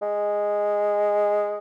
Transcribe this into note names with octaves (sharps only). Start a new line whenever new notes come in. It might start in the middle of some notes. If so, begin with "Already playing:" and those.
G#3